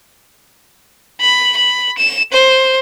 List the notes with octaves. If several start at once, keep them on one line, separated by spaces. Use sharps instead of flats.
B5
B5
E7
C5